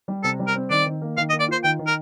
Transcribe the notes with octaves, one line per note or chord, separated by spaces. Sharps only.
G3
C3 A4
G3
A#4
C4
D#3 D5
D#3
A#3
D#3 F5
D#5
A#3
D5
F4 C5
D#3 G5
D#3
A#4